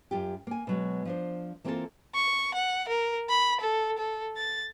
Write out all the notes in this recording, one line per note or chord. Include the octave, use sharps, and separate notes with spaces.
F#2 F4 G4
A#3 G#5
B2 F#3 G#3
F3 D4 C5
E3 A#3 C4 D#4 F4 A4
C#6
F#5
A#4
B5
A4
A4
A6